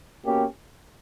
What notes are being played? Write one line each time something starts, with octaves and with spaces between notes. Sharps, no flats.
B2 A#3 C#4 G4